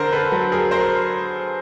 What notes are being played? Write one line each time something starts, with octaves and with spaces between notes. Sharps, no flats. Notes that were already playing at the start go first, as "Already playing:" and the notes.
Already playing: D3 A#4 C5
A4 B4
F#3 A4 B4
G#4 A#4
A#4 C5